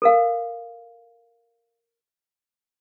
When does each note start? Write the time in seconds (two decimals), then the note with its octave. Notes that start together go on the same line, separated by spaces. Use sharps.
0.02 A4 A#4 F5